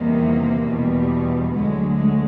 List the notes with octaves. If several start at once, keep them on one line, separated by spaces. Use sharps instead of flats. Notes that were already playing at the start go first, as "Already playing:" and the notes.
Already playing: E2 C3 D#3 G3 A#3
E2 B2 G3
D2 D3 F#3 G#3
G#3